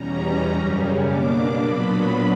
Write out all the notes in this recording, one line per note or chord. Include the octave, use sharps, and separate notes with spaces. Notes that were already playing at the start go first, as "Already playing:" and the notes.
Already playing: E2 B2 G3 C#4 A#5
F#2 C#3 G3 C#4
B2 A#3 D4 D6
A#2 F#3 B3 D4 B5